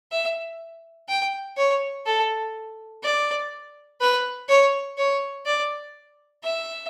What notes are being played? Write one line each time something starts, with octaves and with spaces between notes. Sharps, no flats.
E5
G5
C#5
A4
D5
B4
C#5
C#5
D5
E5